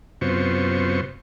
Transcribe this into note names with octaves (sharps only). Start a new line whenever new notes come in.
F#2 C3 B3 F4 C5 C#6